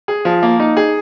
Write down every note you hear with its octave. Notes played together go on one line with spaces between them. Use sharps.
G#4
F3
A#3
D#4
G#4